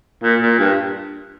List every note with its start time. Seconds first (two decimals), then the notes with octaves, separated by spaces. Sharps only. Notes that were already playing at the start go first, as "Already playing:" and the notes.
0.23 A#2
0.42 A#2
0.59 G2